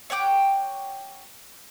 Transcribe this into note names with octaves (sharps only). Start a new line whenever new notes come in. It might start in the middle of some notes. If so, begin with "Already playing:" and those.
C#5 F#5 G5 D6